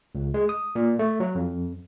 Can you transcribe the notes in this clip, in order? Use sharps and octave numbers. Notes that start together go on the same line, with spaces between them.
C#2
G#3
D#6
A#2
A3
F#3
F2